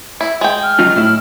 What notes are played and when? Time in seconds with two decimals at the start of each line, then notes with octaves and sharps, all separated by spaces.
0.21 E4
0.41 G#3 G5
0.64 F6
0.79 F#3 D#4 F4
0.96 A2 E4